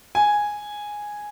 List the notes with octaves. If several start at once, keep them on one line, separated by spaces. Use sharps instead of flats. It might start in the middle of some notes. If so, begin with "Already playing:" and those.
G#5